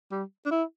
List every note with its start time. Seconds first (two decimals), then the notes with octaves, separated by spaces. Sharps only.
0.11 G3
0.46 D4
0.51 E4